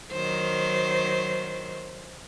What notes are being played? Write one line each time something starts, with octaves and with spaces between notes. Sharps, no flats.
D#3 F#3 C5